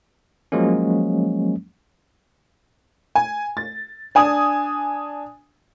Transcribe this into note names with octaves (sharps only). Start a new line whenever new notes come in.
F3 F#3 G#3 A#3 C#4
G#5
A6
D4 G#5 D#6